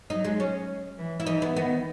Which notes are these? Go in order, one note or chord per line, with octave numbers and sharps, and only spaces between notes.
F#3 D#4
G#3
C#4
E3
E4
E3 D#4
B3
D#3 B3